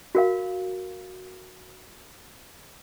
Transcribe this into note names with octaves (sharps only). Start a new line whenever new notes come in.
F#4 A#4 F5